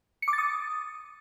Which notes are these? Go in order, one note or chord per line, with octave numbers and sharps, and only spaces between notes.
C#7
D6
A6
D#6